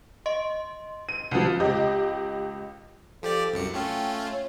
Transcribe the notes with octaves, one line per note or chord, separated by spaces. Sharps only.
D#5 C6
D#7
C2 F3
C#2 G4 D#5
F3 G4 A4 D5
C2 F#2 C#7
A3 C#4 F4 G5
C#5